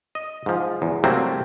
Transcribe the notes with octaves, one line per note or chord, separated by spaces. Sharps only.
D#5
G#2 F3
E2
C3 F#3 G3 A3 A#3 C4